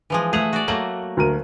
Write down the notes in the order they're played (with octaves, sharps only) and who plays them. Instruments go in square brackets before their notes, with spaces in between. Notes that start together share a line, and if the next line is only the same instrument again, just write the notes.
[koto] E3 F3 G#3
[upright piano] A3 F7 [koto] G#4 E5 F#5
[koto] F#4 D5
[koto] F#3 A3 A#3 [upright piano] F#7
[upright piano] D2 A#4 D#7